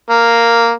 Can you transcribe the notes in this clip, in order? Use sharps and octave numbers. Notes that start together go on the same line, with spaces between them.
A#3